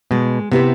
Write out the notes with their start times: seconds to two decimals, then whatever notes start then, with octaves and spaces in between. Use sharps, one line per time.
0.11 B2 G#3
0.51 C3 B3 E4 G4 C5